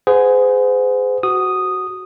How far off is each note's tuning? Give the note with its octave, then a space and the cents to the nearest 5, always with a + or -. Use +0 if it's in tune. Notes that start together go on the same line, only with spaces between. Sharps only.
G#4 +0 C5 -40 F#5 -20
F#4 +15 D#6 -5